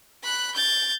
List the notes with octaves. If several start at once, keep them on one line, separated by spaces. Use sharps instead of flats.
B5 F#6
G6 A6